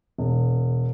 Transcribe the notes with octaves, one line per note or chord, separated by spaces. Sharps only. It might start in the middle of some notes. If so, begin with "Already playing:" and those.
E1